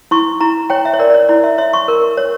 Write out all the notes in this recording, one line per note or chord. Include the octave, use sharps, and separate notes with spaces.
E4 C#6
E4 A#5
C#5 G5
E5
C#5
A#4 D5
D5
C#5
E4 D5
E5
C#5 E5
C#6
A#4
C#5